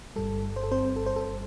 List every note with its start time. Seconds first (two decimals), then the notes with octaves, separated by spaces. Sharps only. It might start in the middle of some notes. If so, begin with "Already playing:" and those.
0.16 G1 G2 G3 A4
0.56 C5
0.64 A4
0.71 C4 C5
0.96 A4
1.06 C5
1.16 A4